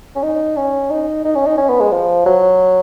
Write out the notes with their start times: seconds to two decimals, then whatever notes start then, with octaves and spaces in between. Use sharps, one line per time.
0.16 C#4
0.23 D#4
0.57 C#4
0.90 D#4
1.25 D#4
1.35 C#4
1.46 D#4
1.58 C#4
1.69 B3
1.81 G#3
1.91 F3
2.26 F#3